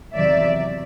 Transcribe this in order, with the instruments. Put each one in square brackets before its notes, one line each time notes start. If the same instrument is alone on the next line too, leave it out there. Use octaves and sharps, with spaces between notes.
[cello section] E2 C3 D#3 F#3 D5 E5